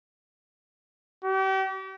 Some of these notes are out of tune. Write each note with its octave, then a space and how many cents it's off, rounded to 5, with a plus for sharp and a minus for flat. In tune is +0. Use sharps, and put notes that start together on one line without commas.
G4 -40